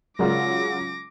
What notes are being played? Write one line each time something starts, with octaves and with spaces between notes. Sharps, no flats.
C#3 F#3 G#3 F4 A#4 D5 D6 A#6